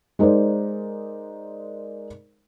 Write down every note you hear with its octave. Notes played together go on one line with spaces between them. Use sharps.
G#3 D#4 A#4 C5 D5